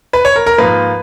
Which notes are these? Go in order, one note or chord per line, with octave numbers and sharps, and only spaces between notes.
B4
C#5
A#4
A#4
G#2 F3 A#3 F4 B4